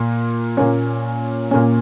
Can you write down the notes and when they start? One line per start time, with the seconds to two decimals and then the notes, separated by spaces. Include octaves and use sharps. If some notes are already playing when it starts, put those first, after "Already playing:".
Already playing: A#2 A#3
0.57 A#2 A#3 C#4
1.51 A#2 A#3 C#4